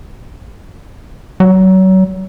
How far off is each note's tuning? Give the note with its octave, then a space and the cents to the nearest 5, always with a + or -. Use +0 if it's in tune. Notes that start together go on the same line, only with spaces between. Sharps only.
F#3 +30